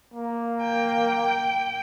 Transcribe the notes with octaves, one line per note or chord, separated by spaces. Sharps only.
A#3
G5